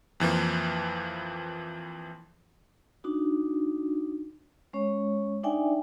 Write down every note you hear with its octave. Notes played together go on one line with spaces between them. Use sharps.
F2 E3 F3 A#3
D4 D#4 F#4
G#3 C#4 C#5
D4 D#4 D5 E5 G5 G#5